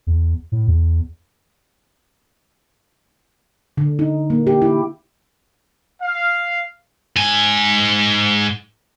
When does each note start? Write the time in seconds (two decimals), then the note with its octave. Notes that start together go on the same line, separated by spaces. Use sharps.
0.07 E2
0.52 A2
0.67 E2
3.77 D3
3.99 D#4
4.30 A#3
4.47 G4
4.62 E4
6.01 F5
7.16 G#2 G#5